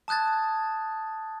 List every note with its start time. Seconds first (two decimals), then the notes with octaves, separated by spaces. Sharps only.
0.08 A5 D#6 F#6 G#6 A6